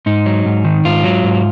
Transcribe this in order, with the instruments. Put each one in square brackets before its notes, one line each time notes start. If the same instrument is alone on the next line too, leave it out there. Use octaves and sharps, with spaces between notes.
[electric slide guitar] G#2 D#4
F#3
G#2
D#3
G#2 F4
F#3
G#2